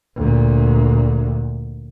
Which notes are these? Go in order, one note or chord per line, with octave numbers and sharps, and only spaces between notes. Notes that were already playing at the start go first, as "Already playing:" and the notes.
D2 A#2